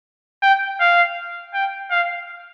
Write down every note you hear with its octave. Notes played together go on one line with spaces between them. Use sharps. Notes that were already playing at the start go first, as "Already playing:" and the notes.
G5
F5
G5
F5